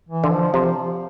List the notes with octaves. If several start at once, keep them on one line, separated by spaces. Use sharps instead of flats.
E3
D3
F3
C3 F3